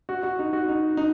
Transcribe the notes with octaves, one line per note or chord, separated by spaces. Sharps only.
F#4
F#4
D#4
F#4
D#4
D#4